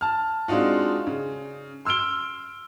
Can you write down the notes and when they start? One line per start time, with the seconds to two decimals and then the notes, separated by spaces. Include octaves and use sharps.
0.01 A5 F6
0.48 G#3 C4 D4 D#4 F4 F#4
1.07 C#3
1.85 C6 E6 F6 D7 G7